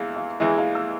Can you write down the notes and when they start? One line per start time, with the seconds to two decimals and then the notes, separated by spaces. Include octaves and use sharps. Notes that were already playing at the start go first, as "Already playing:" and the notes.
Already playing: E2 E3 G#3 F5
0.16 F5
0.40 E2 E3 G#3 E5
0.58 F5
0.75 E6